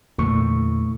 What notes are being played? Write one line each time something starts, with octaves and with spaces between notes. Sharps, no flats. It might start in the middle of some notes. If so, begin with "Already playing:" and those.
E2 A#2 D3 E3 A3 C#6